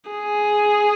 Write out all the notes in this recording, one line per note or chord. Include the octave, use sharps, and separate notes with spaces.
G#4